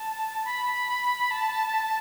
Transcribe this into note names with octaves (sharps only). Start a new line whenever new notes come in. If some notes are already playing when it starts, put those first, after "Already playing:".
Already playing: A5
B5
A5